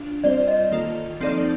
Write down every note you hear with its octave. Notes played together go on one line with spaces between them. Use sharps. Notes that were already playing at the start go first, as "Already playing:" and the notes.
Already playing: D4 F4
G3 C4 F4 C5 D5
D#5
D#3 A#3 F4 A4
F3 C4 D#4 A4 D5